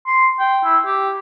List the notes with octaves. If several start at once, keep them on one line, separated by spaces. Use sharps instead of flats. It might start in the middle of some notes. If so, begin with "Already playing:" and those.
C6
G5
E4
G4